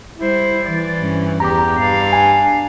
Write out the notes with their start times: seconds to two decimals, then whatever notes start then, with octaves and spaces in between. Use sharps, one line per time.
0.18 G3 E4 C5
0.66 E3 D5
0.99 G2 C#4
1.40 E2 G4 A#5 D6
1.78 G2 D4 F5
2.13 G#5